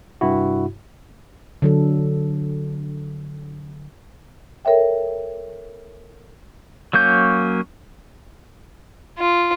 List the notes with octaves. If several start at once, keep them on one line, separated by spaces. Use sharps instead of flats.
G2 C3 E4 F#4
D3 F#3 A4
A4 A#4 C#5 E5 G5
F#3 A#3 C#4 G6
F4